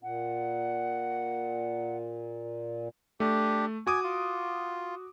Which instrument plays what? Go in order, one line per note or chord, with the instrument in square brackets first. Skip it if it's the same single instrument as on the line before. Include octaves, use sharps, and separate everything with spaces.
[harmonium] A#2 [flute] F#5
[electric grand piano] A3 [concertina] D4 G4
[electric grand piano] F#4 D6 D#6 [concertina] G#5
[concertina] F4